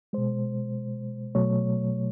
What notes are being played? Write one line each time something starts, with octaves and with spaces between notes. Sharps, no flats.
B2 G#3 C5
B2 F#3 A3 C#5